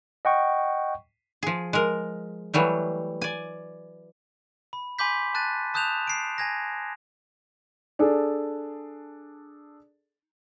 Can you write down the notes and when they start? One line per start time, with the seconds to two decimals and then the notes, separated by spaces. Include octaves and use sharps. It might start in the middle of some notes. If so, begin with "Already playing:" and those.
0.25 D#5 F#5 G5 C#6
1.43 F3 G#4
1.73 G#3 A#4
2.54 E3 F#3 G3 A3
3.22 D5 G#5
4.73 B5
4.99 G#5 B5 C6 D6 G6 B6
5.34 A5 F#6 A6 D#7
5.74 A5 D#6 F#6 G6 E7 F7
6.07 C7 D7
6.38 G#5 G#6 A#6
7.99 D4 G#4 A4